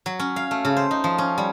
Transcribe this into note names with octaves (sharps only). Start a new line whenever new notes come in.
F#3
C#4
F5
A3
C#3
C5
D#4
F3
C#4
G3